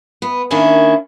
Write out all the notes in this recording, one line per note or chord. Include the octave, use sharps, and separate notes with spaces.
B3
D#3 A#3 C#4 D4 E4